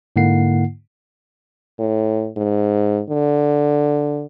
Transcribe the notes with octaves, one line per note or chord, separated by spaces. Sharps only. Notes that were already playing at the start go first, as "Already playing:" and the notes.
G#2 D3 A#3 E4 F#5 C7
A2
G#2
D3